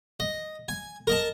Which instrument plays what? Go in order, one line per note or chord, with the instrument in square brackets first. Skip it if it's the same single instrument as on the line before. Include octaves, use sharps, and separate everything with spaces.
[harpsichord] D#5
G#5
A#4 D#5 A5